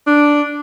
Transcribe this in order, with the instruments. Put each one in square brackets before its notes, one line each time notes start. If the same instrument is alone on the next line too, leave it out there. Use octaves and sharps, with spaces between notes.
[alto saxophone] D4